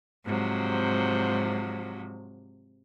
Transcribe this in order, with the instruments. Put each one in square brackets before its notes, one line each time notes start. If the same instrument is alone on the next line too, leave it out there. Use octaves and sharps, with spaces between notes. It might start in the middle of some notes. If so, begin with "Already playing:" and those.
[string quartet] G#2 C3 F3 F#3